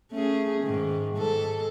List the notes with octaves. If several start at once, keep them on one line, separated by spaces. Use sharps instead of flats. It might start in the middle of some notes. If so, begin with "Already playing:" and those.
A3 C#4 G#4
G#2 D#3
G#2 A4